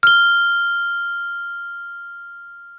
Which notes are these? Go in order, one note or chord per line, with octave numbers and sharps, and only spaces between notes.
F6 G7